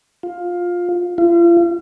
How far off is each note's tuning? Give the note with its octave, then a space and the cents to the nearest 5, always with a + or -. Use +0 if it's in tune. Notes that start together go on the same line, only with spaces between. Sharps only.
F4 +10
F4 -40